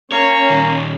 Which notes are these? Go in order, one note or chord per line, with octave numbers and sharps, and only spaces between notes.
A#3 C#4 C#5
A#2 D#3